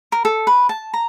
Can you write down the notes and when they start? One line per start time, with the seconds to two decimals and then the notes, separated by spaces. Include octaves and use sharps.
0.12 A#4
0.25 A4
0.47 B4
0.69 A5
0.94 A#5